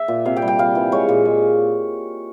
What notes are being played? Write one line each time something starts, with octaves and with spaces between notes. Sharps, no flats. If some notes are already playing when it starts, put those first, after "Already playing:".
Already playing: E5
A#2
C3 F5
G5
G3
G5
G3 F5
E3
G#3 C#5
A#2
G#3